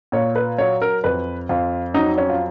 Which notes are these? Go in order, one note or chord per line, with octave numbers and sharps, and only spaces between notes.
A#2 C#5
B4
F#3 C#5
A#4
F2 B4
F2 F4
F#3 D#4
C#4
F4